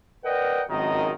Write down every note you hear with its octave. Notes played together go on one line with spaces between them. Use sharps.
A#4 B4 D5 D#5 F#5 G5
G#1 C#2 F#2 D#3 D#5 A#5